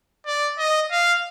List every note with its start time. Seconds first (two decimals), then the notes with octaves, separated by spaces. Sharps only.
0.26 D5
0.58 D#5
0.91 F5